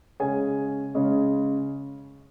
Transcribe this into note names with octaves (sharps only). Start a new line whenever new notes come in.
C#3 G#3 C#4 G#4 G#5
C#3 G#3 C#4